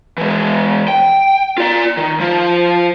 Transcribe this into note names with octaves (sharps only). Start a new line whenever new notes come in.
E3 G#3
G5
F4 D5
D#3
F3 F4